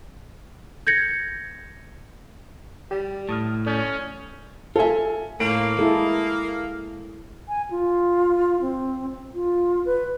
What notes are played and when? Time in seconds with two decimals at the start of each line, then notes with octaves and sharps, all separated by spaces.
0.87 G6 G#6 A#6 C#7
2.91 G3 G4
3.29 A2 A5 D#6 F6
3.66 C#4 A4 D5 D#6 G6
4.76 F4 A4 E5 G#5
5.40 A2 A#3 D7
5.79 G#3 E4 G#4 A4
7.48 G#5
7.71 F4
8.62 C4
9.35 F4
9.85 B4